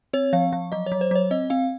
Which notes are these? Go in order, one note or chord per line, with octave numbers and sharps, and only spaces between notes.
C4 C#5
F3 F5
F3 F5
F#3 D#5
C#5
F#3
C5
F#3 C#5
C4 D#5
C4 F5